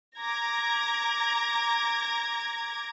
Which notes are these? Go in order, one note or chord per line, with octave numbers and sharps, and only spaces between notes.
A#5 D6 G#6 A#6